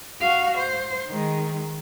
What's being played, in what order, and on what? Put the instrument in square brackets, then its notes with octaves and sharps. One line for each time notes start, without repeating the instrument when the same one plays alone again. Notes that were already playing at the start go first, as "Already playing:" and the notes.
[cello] F#4 F5
C5
D#3 G#3